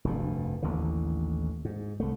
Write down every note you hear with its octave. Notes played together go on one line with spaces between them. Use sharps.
F1 D2 G2
A1 D#2 D3 E3
G#2
C2 A3